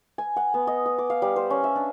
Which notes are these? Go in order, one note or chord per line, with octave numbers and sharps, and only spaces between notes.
G#5
F#5
B3
D#5
D#6
D6
F5
G3
C5
C#4
E5
D4